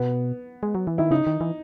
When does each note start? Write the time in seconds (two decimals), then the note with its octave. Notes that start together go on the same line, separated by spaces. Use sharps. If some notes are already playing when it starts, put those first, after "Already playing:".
Already playing: B2 B3
0.63 G#3
0.75 F#3
0.87 E3
0.98 D#3 E4
1.11 C#3 D#4
1.27 D#3
1.41 E3